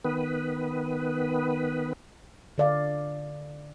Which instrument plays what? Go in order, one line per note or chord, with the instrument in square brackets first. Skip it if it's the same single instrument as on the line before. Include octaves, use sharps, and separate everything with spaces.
[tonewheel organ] D#3 B3 B4
[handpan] D3 D5 F5